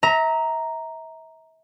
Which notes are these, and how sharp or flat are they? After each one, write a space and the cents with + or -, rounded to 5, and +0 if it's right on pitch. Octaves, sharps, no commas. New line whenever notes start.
E5 -35 A#5 +0